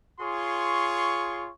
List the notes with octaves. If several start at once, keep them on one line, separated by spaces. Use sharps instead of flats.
F4 G#4 C#5 C6 C#6